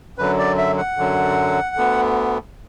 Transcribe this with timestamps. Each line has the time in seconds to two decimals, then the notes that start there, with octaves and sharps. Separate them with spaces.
0.18 F#2 D3 F#3 B4
0.39 D5
0.58 E5
0.78 F#5
0.97 F#2 D3 F#3
1.75 D2 D3 B3